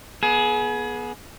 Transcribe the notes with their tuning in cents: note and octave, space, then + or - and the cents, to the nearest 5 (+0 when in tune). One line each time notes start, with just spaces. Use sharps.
B3 -25 G#4 +25